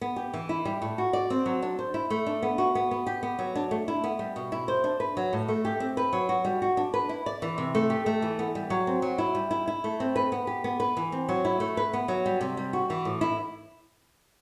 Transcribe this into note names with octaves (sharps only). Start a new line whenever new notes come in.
B3
G4
E3
E4
G3
A2
F#4
D5
C4
F#3
D4
C5
E4
A3
D4
B3
F#4
B3
B3
G4
B3
F#3
D4
A3
E4
B3
G3
B2
E4
C5
D4
B4
F#3
A2
A3
G4
C4
B4
F#3
F#4
G3
F#4
D4
B4
E4
D5
E3
C3
A3
G4
A3
E3
B3
G3
F#3
C4
F#3
E4
G3
E4
E4
A3
C4
B4
B3
G4
B3
B4
E3
C4
F#3
E4
A3
B4
B3
F#3
G3
C3
G3
F#4
E3
A2
E4